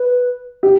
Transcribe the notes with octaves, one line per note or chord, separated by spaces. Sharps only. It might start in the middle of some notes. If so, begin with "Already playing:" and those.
Already playing: B4
G4